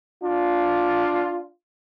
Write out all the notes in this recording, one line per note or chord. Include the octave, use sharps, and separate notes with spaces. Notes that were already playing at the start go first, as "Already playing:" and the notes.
D4 F4